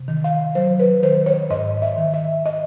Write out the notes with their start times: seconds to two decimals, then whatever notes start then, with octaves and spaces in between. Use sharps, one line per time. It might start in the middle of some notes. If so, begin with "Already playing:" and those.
Already playing: C3
0.08 D#3
0.24 F5
0.55 F#3 C5
0.80 B4
1.03 D#3 C5
1.26 C#5
1.50 G#2 D#5
1.82 E5
1.98 D#3
2.14 E5
2.46 D#5